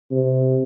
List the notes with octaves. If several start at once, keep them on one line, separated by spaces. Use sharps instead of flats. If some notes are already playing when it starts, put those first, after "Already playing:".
C3